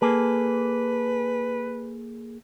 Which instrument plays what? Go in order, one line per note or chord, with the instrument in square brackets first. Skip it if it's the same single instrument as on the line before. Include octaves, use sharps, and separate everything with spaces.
[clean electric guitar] A#3 G#4 A4 [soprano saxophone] B4